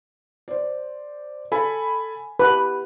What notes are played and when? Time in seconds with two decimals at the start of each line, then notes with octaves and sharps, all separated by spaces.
0.48 C5 D5
1.52 A4 G#5 B5
2.39 G4 B4